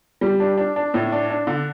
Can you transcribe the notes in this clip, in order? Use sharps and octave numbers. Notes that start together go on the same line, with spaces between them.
G3
D4
D4
D4
A2
D4
D4
D3